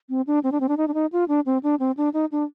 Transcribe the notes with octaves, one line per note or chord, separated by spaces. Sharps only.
C4
D4
C4
D4
C4
D4
D#4
D4
D#4
F4
D4
C4
D4
C4
D4
D#4
D4